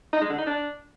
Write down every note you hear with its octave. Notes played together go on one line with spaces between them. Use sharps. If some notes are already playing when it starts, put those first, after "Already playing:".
D#4
G#3
D3
D#4
D4